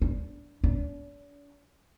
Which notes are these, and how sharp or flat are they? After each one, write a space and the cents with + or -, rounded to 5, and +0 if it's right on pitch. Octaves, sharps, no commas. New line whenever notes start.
D4 -20
D4 -45